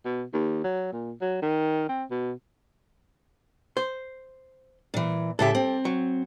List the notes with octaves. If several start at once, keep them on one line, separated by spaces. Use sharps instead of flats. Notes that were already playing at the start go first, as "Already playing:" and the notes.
B2
D#2
F#3
A#2
F#3
D#3
C4
B2
C5
A#2 E3
A2 C#3 G4 A4 E5
C4
F#3